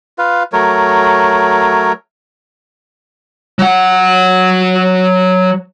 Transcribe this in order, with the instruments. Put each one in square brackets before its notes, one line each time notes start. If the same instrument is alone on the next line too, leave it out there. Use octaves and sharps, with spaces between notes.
[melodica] F4 B4 F5
F#3 A3 A#4 C#5
[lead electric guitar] F#3 F#5